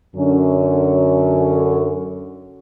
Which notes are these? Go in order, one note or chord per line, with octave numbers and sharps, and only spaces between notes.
F#2 D3 C#4